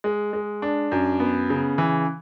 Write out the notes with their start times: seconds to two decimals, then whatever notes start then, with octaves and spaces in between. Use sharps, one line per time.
0.04 G#3
0.33 G#3
0.62 D4
0.91 F#2
1.20 B3
1.50 C#3
1.78 E3